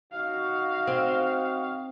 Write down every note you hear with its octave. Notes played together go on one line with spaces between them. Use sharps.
D#4 F#4 F5
C4